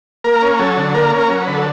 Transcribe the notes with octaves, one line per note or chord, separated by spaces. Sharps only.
A#3 A#4
C#4
F#3 A4
D3
A#3 A#4
C#4
A#4
F#3 A#4
B4
D3
A4